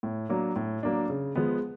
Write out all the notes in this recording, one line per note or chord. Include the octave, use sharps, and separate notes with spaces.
A2
F#3 A#3 D4
A2
F#3 A#3 D4
C#3
F3 G#3 B3